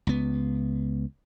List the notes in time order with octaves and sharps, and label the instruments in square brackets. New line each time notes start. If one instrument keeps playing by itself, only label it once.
[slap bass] C#2 B3